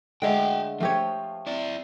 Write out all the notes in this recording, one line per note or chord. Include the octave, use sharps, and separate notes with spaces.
D3 G#3 A3 F#4 G5
F3 A3 G4 C#5
E4 D5